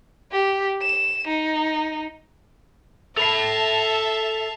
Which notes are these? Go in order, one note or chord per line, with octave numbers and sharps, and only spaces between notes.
G4
E7
D#4
A4 E5 A5 B5 C7 F7